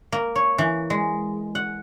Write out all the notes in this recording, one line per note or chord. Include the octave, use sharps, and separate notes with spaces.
A#3
C#5
E3
G#3
F#5